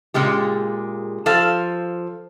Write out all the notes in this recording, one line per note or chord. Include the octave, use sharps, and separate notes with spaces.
A#2 C#3 G#3 G4
F3 A4 F5